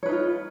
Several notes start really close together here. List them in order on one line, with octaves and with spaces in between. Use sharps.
C#5 B4 D#4 F4